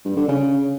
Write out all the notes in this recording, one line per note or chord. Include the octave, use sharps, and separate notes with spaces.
G2
D3
C#3